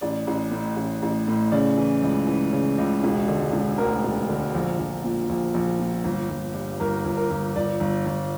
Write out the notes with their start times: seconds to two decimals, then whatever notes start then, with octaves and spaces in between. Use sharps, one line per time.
0.01 A1 D5
0.27 A1
0.51 A2
0.76 A1
1.02 A1
1.28 A2
1.52 C#3 D5
1.78 E3
2.02 C#2
2.27 E3
2.53 C#3
2.78 C#2
3.04 E1
3.28 D3
3.53 E1
3.78 D2 A#4
4.04 E1
4.29 D3
4.54 A#1
4.79 A#1
5.04 A#2
5.29 A#1
5.54 A#1
5.80 A#2
6.04 G1
6.30 G1
6.54 G2
6.80 G1 A#4
7.05 G1
7.17 A#4
7.30 G1
7.56 G1 D5
7.80 G1
8.06 G1